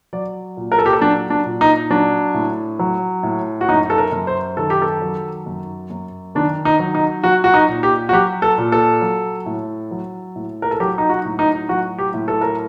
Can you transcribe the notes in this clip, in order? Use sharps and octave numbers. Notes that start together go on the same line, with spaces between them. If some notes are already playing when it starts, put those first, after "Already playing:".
F#3 D5
A#2
A#4
A4
G4
A4
F#3 D4
D4
A#2
D#4
F#3 D4
A2
F#3
A2
F#4
F#2 D#4
A4
A#4
F#2
C5
D#3 A4
G4
A4
F#3
F#2
F#2
D#3 D4
D#4
F#3
D#4
F#3 F#4
F#4
D#4
A#2
G4
F#4
F#3 G4
A4
A#2
A4
F#3
A2
F#3
A2
A#4
A4
F#3 G4
D#4
F#4
A2
D#4
F#3 F#4
G4
A2
A4
A#4